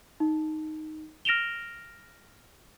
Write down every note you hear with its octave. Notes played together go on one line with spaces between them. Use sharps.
D#4
F6 A#6 D7 E7 F7 G7